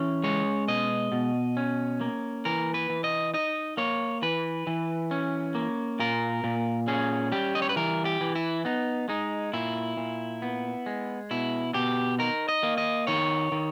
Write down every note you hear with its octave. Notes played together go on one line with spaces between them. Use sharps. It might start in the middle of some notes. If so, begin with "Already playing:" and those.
Already playing: E3 C#4
G#3 C#5
B2 D#5
B2
C#4
A#3
E3 A#4
B4
E3
D#5
D#4 D#5
A#3 C#5
E3 B4
E3
C#4
A#3
A#2 A#4
A#2
C#4 G#4
G3 G4
D#5
C#5
B4
E3 A#4
G4
E3
E4
B3 D#4
G#3 D#4
A#2 E4
A#2
B3
G#3
B2 E4
B2 G4
D#4 A#4
D#5
A#3
D#5
D#3 C#5
D#3